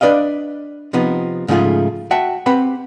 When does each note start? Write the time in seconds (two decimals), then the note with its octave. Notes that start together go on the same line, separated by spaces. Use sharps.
0.01 D4 B4 D5 D#5 F5
0.93 C3 F3 B3 D#4
1.48 G#2 C#3 F3 A3 F4 G#4
2.11 F#4 E5 F#5 G5 A5
2.46 C4 G4 B4 F#5 B5